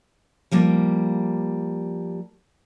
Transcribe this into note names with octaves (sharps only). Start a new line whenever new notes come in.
F3 G3 A#3